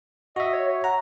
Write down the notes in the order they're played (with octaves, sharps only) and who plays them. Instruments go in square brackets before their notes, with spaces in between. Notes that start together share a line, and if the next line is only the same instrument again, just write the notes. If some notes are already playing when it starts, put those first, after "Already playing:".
[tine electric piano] F#4 E5 [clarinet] D#5
[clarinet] C#5
C#5
[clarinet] F#5 [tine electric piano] A#5